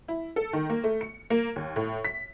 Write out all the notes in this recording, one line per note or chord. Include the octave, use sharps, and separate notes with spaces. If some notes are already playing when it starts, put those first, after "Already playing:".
E4
A4
D#3
A#3
A3
C#7
A#3
D#2
A2
B6